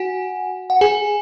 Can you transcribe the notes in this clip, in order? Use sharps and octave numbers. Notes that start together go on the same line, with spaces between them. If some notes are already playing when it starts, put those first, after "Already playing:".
Already playing: F#4 F#5 G#5
F#5
G#4 G#5